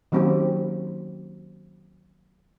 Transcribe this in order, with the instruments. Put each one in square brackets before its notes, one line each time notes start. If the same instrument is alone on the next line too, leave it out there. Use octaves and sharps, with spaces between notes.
[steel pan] D#3 F#3 A#3 C4 C#4 G4